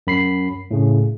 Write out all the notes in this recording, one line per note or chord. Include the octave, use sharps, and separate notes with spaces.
F#2 B5 C7
A2 C#3